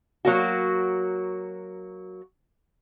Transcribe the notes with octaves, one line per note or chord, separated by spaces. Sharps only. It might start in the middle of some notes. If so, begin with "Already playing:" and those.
F#3 A#3 F#4